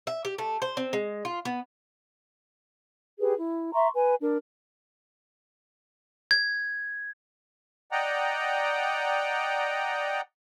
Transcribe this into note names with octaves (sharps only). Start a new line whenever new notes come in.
E5
G4
A3
C5
C4
G#3
F4
B3
G4 G#4 B4
E4
E5 A#5 C6 C#6
B4 G#5
D4 A#4
G#6
D5 D#5 F#5 G5 A#5